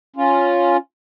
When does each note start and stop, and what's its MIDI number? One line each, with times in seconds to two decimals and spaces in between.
0.16 0.77 61
0.16 0.77 65